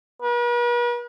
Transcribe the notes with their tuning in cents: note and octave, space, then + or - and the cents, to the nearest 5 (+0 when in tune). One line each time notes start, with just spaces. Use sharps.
B4 -45